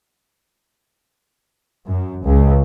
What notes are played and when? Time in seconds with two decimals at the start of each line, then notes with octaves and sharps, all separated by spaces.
1.89 F#2
2.25 C#2